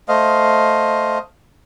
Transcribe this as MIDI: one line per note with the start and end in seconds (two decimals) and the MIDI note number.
0.09 1.19 57
0.09 1.19 72
0.09 1.19 75
0.09 1.19 77